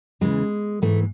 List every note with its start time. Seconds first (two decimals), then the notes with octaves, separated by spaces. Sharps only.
0.21 E2 C#3 E3 G#3
0.82 G#2 E3 A3